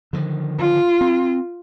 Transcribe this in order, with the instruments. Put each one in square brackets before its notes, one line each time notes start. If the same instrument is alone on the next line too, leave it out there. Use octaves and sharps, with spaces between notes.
[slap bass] D3 D#3 F3
[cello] F4
[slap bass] C4